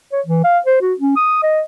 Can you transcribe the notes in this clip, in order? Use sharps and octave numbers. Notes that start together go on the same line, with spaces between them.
C#5
E3
F5
C5
F#4
C#4
D#6
D#5